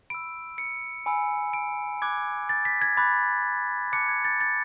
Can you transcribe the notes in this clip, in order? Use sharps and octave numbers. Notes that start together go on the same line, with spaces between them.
B5 E6 D7
C#7
G#5 B5 E6
D7
B5 D6 F#6 G#6
A6
B6
G#6
B5 D6 F#6 A6
A5 D6 F#6 C#7
G#6
A6
A6